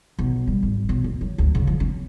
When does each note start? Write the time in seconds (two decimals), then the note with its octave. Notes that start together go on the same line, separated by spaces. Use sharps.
0.19 B1
0.47 G3
0.63 G#1
0.89 B1
1.04 D2
1.21 F#3
1.38 D2
1.55 C#3
1.67 F3
1.80 C#4